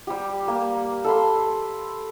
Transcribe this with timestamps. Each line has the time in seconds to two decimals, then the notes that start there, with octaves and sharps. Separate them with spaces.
0.07 G3 G4
0.48 A#3
1.04 A4 B5 C6